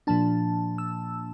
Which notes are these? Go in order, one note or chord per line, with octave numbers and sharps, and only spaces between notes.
A#2 F3 A#3 D4 A5
E6